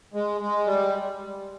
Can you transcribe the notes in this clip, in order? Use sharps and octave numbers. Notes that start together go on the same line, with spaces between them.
G#3
G#3
G3